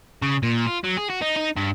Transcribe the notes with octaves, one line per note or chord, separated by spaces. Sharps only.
C#3
A#2
F4
F#3
G#4
F#4
D#4
D#4
G2